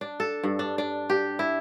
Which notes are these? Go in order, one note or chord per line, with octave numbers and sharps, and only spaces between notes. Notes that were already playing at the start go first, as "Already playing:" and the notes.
D4
A4
G2
D4
D4
G4
E4